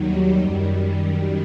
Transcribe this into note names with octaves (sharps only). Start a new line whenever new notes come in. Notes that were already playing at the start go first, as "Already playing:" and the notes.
Already playing: D#2 D#3 F#3 G3
F#2 D#3